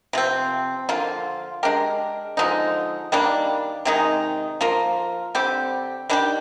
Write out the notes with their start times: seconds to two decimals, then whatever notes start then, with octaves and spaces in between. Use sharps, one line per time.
0.13 C3 F3 C4
0.89 D3 F3 A#3 F4
1.63 G#3 D4 G4 A#4
2.37 D3 F3 G#3 D#4
3.12 D#3 G3 A#3 D4
3.85 C3 D#3 G#3 D#4
4.61 F3 A#3 F4 A#4
5.35 D3 G3 C4 G4
6.09 D#3 G3 D4 G4